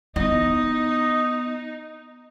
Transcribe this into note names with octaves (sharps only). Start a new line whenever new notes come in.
B3 D#4 E4 D#5